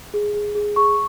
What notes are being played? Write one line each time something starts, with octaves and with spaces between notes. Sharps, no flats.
G#4
G#4
G#4
G#4 C#6